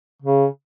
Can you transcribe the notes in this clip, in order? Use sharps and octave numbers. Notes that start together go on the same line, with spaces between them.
C#3